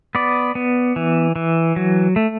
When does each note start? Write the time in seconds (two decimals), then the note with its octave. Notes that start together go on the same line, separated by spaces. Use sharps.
0.15 B3 D5
0.55 B3
0.96 E3
1.36 E3
1.76 F#3
2.16 A3